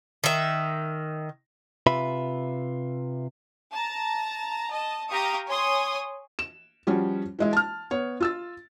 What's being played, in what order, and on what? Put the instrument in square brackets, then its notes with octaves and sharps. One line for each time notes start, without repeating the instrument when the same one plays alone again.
[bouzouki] D#3 E5
[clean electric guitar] C3 F4 B4 E5 B5
[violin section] A5 A#5
D#5 A5
G4 F5 G5 A#5 C#6 D#6
C#5 G#5 C6 D#6
[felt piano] E7
F3 G3 C#4 F#4
E3 G#3 E4
A5 F6
B3 C#5
F4 E6 A6